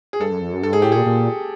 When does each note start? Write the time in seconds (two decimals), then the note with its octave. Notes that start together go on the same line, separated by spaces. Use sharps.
0.13 G#4
0.20 G2 A4
0.31 F#2
0.41 F2
0.53 F#2
0.63 G2 A4
0.73 G#2 G#4
0.82 A2 G4
0.92 A#2 G#4
1.06 A#2